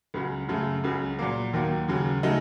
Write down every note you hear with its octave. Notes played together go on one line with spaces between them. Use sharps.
C#2 C#3 F#3
F#2 C#3 F#3 A3
C#2 C#3 F#3
A#2 F#3 A#3
D#2 D#3 F#3 A#3
D#2 C#3 F#3
C#3 F#3 A3 D#4